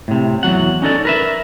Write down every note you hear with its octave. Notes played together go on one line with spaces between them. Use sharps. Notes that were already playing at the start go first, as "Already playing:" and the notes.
A2 C3
E2 F#3 F#5
C#4 D#4 A4 D5
A#4 B4 E5